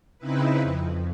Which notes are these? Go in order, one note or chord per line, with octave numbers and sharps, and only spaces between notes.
C#3 C4 D#4 E4 B4
F2